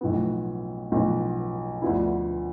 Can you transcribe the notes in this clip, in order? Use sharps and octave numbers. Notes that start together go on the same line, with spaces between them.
B1 A2 F3 B3
B1 A2 F3 B3
D2 D3 F3 B3 E4